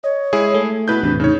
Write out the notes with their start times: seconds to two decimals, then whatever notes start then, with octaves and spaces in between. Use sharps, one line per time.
0.04 C#5 D#5
0.33 G#3 E4 G#4
0.54 A3
0.88 B2 E4 B4 G6
1.03 E2 A2 C3 D4
1.20 C#3 D#4 C#5